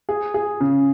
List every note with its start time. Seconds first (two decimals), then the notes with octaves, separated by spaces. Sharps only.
0.09 G#4
0.34 G#4
0.61 C#3